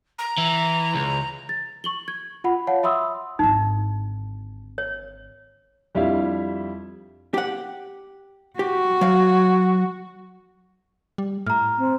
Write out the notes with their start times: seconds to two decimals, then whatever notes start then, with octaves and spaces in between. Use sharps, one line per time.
0.18 A#5
0.38 E3
0.95 C#2
1.49 A6
1.84 C#6 F#7 G7
2.08 G#6
2.44 F4 F#5 B5
2.67 C#5 F5 F#5 A5
2.83 E5 B5 C6 D#6 E6
3.39 G#1 D3 D#4
4.78 C#5
5.95 F2 G3 D4 E4 E5 F5
7.34 G4 F#5
8.59 F#4 G4
9.01 F#3 F5
11.18 G3
11.47 A2 A#5 F6
11.78 C4